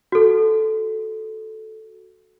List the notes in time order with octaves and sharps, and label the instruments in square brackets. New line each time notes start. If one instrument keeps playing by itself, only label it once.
[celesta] F#4 A4